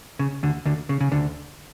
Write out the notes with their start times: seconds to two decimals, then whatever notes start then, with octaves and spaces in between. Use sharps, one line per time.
0.19 C#3
0.43 D2 D3
0.65 D2 D3
0.89 C#3
1.01 C#3
1.12 D2 D3